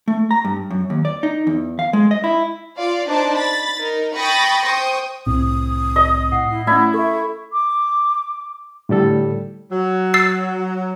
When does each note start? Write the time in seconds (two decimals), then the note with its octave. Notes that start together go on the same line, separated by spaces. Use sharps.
0.08 A3
0.31 A#5
0.45 G2
0.71 F#2
0.90 D#2
1.05 D5
1.23 D#4
1.47 E2
1.79 F5
1.93 G#3
2.11 D#5
2.24 E4
2.76 F4 D5 F5
3.07 D4 D#4 C5 D5 A5 D6
3.37 B5 A6 B6
3.78 D#4 A#4
4.16 G5 B5 C#6 D#6 A6 A#6
4.65 C5 G5 C#6 D#6
5.26 C2 A2 C4 D#6
5.96 D#5
6.32 A2 F#5 C7
6.50 E4
6.67 A3 C#4 E4 F#5
6.94 A4 E5 C#6
7.53 D6
8.89 A2 D3 G3 A4
9.72 F#3
10.14 E6 A6 C7